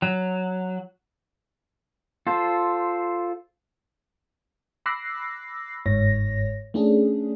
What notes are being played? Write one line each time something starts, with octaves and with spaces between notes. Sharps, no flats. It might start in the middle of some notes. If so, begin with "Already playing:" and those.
F#3
F4 A4 C5
B5 D6 E6 F#6 A#6 C7
G1 G#2 C#5 A#6
A3 C#4 D4 G#4